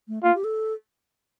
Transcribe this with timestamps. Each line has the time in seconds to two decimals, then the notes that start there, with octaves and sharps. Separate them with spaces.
0.08 A3
0.23 A#3 F4
0.35 G4
0.44 A4